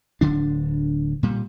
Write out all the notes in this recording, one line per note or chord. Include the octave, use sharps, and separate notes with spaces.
D1 D3 D4
A#2 G3